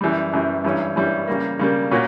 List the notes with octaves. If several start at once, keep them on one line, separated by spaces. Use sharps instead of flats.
F#2 E3 G3
F#2 E3 G3
G2 E3 G3 C#4
G2 E3 G3 C#4
C#3 G3 A#3
C#3 G3 A#3
A#2 A#3 C#4 F#4